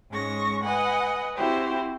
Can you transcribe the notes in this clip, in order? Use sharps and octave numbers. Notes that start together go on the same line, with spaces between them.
G#2 G#3 C#4 C#6 A#6
B4 D#5 F#5 G#5
C4 E4 F#4 G4 C5